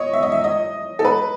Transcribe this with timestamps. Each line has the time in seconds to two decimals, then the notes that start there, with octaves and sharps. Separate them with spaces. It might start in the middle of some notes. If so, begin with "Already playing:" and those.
Already playing: C#5 D#5
0.13 E5
0.23 D#5
0.32 E5
0.44 D#5
0.99 A4
1.05 B4